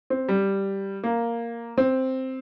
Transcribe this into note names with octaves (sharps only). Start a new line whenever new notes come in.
C4
G3
A#3
C4